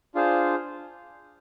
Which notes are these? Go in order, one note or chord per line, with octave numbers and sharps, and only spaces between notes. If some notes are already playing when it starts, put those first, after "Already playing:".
D4 F4 G#4 C5 F5